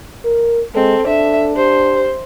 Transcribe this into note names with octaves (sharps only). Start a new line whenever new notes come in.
A#4
G#3 C4 A4
D4 A4 E5
G4 C5